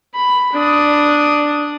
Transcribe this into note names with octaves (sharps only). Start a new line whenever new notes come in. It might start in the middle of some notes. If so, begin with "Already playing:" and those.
B5
D4 D#6